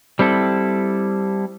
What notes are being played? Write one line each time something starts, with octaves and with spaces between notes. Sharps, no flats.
G3 C4 E4 A4